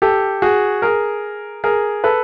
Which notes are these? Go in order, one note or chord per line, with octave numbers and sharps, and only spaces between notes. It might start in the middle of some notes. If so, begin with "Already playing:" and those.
G4 A4
F#4 G#4
G#4 A#4
G#4 A#4
A4 B4